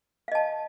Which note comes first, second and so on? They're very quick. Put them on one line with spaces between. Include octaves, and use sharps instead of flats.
F5 D#5 A5